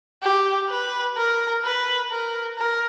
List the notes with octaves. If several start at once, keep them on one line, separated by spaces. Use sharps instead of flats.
G4
B4
A#4
B4
A#4
A#4